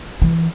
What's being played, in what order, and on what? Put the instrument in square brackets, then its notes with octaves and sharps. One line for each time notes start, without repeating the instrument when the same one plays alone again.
[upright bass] E3